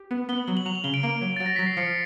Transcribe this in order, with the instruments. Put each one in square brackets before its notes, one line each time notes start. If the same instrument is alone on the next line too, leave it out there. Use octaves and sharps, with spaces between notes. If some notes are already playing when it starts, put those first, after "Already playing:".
Already playing: [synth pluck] G4
B3
[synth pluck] B3 [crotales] G7
[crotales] F#7
[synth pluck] F#3 [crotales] G7
[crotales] F#7
[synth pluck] F#3 [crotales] F7
[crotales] F#7
[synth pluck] C#3 [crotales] G7
[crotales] D7
[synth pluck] A#3
F#3
[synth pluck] F#3 [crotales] A6
[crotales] A#6
[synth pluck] F#3 [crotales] B6
[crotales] C7
[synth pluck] F3 [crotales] C#7